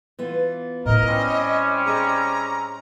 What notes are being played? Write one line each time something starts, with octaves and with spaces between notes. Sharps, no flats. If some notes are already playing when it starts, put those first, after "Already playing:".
E3 B3 F4
A2 E4 A#4 D#5
G3 C4 C#4
G#4 D#5 A#5